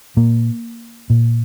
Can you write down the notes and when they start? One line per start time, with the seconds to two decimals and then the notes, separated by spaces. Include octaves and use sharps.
0.17 A#2 A#3
1.10 A#2